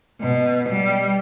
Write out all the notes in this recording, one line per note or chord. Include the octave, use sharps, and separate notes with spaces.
B2
G3